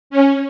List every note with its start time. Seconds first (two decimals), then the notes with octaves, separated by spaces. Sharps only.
0.10 C#4